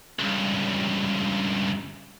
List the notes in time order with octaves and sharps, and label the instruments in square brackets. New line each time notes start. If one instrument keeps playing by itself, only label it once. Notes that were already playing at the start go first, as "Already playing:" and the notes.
[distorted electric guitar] C#2 G2